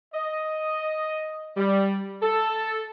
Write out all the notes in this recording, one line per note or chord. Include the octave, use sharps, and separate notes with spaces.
D#5
G3
A4